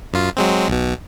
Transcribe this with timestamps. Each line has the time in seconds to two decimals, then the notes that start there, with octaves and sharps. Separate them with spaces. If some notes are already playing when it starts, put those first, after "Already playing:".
0.13 F#2 F4
0.37 F#3 G#3 C4
0.68 B1 B2